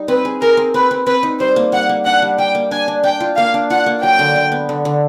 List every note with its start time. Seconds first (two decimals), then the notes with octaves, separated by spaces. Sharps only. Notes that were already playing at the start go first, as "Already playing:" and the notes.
Already playing: G3 D#4
0.08 C4 B4
0.25 G#4
0.41 G#4 A#4
0.57 C4
0.74 C4 B4
0.91 C4
1.07 C4 B4
1.23 D#4
1.40 G3 C5
1.56 A#3
1.72 G3 F#5
1.89 A#3
2.06 D4 F#5
2.22 G3
2.38 G3 G5
2.55 A#3
2.71 D4 G#5
2.88 D4
3.04 D4 G5
3.20 F4
3.37 A#3 F5
3.54 D4
3.70 F4 F#5
3.86 A#3
4.02 F#3 G5
4.19 D3
4.36 D3
4.52 B3
4.69 D3
4.85 D3